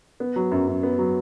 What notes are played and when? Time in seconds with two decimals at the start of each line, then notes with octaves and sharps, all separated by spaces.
0.20 B3
0.36 F#3
0.52 F#2
0.68 F#2
0.83 B3
0.98 F#3